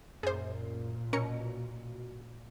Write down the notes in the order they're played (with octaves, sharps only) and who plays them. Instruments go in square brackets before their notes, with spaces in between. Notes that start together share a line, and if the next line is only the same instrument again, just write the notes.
[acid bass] F#2 [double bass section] A#2 [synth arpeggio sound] G#4 C5
[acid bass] B2 [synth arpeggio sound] C#4 A#4 C#7